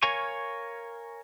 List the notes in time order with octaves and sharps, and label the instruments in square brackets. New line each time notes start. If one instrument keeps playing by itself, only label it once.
[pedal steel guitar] A#4 C#5 F5 G#5 C#6